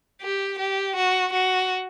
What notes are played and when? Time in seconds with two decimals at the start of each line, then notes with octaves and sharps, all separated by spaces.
0.22 G4
0.59 G4
0.96 F#4
1.33 F#4